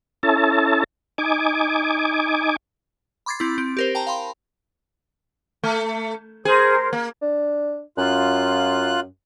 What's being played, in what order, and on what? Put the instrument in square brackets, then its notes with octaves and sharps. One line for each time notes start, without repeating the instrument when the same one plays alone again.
[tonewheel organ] C#4 E4 A4 A5
D#4 G#5 D6
[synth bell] B5 C6 D6 G#6 A6 C7
C4 E4 A6
C4 D7
G4 A#4 C5
G5 A5 A#5
F5 G5 B5 C6
[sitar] A3
[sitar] G#4 [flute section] A#4 C5
[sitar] A#3
[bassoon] D4
[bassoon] F#2 [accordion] F4 F#6